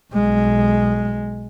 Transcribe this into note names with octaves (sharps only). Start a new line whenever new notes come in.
B1 G#3